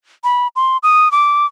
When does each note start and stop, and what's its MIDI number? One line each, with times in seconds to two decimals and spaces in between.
0.24 0.48 83
0.56 0.77 84
0.83 1.11 87
1.12 1.46 86